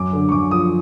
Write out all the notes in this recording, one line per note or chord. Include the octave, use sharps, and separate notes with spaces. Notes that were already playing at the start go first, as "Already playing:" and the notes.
Already playing: F#2 D6
D3
C#6
F#2 D6
F3 D#6